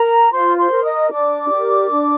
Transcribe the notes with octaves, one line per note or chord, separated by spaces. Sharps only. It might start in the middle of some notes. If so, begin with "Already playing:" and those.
Already playing: A#4 A#5
F4 C5 C6
C5 C6
A#4
D#5 D#6
D4 D5 D6
G4 A#4
D4